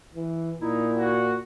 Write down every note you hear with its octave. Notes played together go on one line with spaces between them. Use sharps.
E3
A#2 D#4 E4
F#4